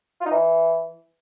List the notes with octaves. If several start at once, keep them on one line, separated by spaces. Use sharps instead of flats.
F4
D#4
E3